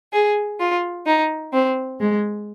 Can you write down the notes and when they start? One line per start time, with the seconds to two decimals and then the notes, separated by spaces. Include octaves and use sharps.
0.12 G#4
0.59 F4
1.06 D#4
1.53 C4
2.00 G#3